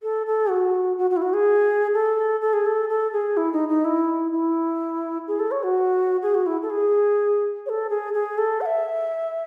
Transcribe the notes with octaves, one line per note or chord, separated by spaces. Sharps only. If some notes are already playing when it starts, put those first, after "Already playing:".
A4
A4
F#4
F#4
F#4
E4
F#4
G#4
A4
A4
G#4
A4
A4
G#4
E4
D#4
D#4
E4
E4
G#4
A4
C#5
F#4
G#4
F#4
E4
A4
G#4
C#5
A4
G#4
G#4
A4
F#5
E5